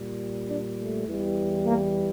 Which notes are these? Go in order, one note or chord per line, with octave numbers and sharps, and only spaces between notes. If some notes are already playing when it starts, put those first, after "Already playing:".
Already playing: A#2 G3
D4
A3
E2 E3 G3
A#3